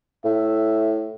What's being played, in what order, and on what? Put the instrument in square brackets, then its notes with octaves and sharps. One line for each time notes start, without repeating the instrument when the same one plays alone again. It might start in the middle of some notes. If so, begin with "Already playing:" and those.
[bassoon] A2 [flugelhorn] E5